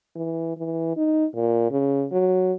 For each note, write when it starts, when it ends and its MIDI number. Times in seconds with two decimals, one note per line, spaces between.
0.16 0.54 52
0.57 0.93 52
0.97 1.25 63
1.35 1.71 46
1.71 2.06 49
2.12 2.53 54